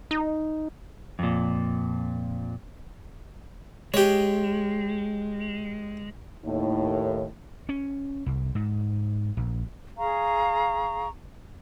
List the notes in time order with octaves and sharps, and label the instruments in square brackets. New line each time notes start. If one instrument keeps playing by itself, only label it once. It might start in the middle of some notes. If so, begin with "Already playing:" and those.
[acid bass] D#4
[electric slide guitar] F2 A#2
[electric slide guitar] G#3 [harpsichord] G4 C#5
[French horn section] D#2 A2
[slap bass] C#4
C2
G#2
A#1
[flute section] G#4 F5 A#5 C#6